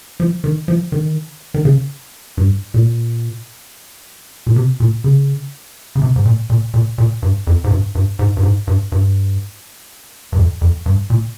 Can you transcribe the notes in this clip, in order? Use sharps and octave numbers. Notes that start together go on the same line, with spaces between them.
F3
D#3
F3
D#3
D#3
C#3
G2
A#2
A#2
C3
A#2
C#3
C#3
C3
G#2
A#2
A#2
A#2
A#2
G2
F2
G#2
G2
G2
G#2
G2
G#2
G2
G2
G2
F2
F2
G2
A#2